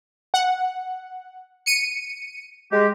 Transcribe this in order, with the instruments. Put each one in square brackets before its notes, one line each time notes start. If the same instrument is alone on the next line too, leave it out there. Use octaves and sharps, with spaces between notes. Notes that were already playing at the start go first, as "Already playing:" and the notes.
[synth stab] F#5
C#7 D#7
[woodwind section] G#3 G4